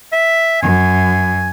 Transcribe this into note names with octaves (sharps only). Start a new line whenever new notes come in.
E5
F#2 G#5